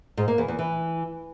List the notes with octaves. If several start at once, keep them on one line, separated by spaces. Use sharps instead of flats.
G#2
A#3
E2
E2
E3